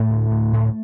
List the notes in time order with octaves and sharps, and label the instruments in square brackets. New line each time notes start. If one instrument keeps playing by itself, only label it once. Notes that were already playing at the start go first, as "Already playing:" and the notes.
Already playing: [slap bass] A2 A3
D2
D2
A2